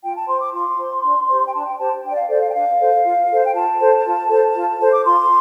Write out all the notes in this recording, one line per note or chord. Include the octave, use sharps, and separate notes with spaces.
F4 G5
A5
C5 C6
D6
F4 C6
C5
D4
G4 C5
G5
D4 A5
G5
G4 C5 A5
D4 G5
D5
F5
A4 C5 D5
F5
G5
D4 F5
A4 C5
F4
A4 C5
G5
F4 A5
A4 C5
F4
A4 C5
F4
A4 C5
D6
F4 C6